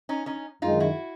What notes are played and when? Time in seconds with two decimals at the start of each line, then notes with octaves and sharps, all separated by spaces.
0.09 C#4 D#4
0.26 C#4 D#4
0.62 F#2 D#3 G#3 D#4 F4
0.80 E4 F#4